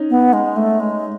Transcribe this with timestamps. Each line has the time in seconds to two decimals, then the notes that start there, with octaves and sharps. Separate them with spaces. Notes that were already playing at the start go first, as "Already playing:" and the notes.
Already playing: C#4 D#4
0.10 B3
0.33 G#3
0.56 A3
0.80 G#3